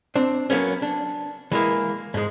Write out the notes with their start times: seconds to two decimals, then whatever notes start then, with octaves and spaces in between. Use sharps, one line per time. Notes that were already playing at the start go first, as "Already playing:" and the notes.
0.16 C4 D4
0.50 F#3 G3 A#3 B3 C#4
0.82 D4
1.52 E3 G#3 A#3
2.14 G#2 G#3